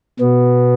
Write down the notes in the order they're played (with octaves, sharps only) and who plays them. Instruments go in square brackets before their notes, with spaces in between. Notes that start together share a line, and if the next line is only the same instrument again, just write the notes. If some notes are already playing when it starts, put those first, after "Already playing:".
[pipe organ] B2 B3